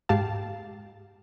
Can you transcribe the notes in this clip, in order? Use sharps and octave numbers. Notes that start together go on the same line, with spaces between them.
G#2 G#3 G4 F5 A5